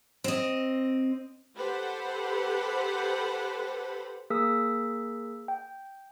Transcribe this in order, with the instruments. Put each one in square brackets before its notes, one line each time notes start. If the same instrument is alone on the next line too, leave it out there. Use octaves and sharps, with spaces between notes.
[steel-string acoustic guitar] C4 D#5
[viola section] G4 A4 B4 C5 F#5 B5
[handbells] A#3 G#4 A#4 D#6 E6 B6
G5